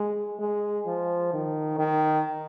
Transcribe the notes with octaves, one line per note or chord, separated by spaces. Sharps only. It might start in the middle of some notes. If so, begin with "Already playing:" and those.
Already playing: G#3
G#3
F3
D#3
D#3